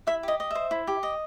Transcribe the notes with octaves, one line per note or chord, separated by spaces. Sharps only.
E4 E5
G4 D#5
D#5
C5 E5
E4
G4
D#5